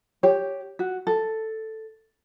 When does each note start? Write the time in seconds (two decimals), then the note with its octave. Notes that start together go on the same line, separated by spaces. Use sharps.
0.23 G4 C#5
0.79 F#4
1.07 A4